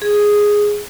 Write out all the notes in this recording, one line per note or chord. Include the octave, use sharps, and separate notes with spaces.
G#4